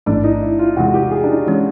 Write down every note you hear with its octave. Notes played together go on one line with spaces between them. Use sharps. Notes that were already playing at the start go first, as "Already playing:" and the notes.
A1 G#2 E3 A3 D4
D#4
E4
F4
E2 C3 E3 G#3 F#4
G4
G#4
D4
D#4
E3 G#3 C#4